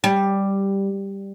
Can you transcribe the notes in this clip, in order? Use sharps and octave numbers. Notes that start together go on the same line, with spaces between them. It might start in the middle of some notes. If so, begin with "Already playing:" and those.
G3